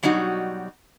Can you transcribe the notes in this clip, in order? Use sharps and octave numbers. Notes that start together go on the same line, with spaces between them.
B2 F#3 G3 D#4 F#4